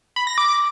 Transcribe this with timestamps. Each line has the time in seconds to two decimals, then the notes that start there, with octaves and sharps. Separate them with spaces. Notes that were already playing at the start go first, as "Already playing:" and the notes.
0.16 B5
0.27 A#6
0.38 D6